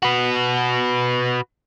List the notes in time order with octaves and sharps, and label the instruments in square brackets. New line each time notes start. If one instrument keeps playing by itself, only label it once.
[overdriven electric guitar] F#4 B4